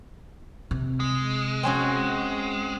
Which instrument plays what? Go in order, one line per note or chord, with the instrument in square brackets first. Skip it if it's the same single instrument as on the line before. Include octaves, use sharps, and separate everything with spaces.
[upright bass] C3
[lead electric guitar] G#3
[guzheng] C4 C#4 F#4